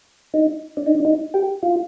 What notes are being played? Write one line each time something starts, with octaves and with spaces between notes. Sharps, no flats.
D#4
D4
D#4
D4
D#4
G4
F4